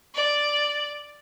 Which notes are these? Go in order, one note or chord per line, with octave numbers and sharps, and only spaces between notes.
D5